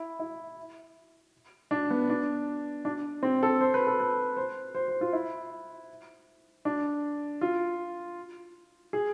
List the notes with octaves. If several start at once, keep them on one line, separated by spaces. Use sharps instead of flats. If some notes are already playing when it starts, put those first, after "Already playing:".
Already playing: E4
E4
D4
B3
D4
D4
C4
A4
C5
B4
A4
B4
C5
C5
C5
F4
E4
D4
F4
G#4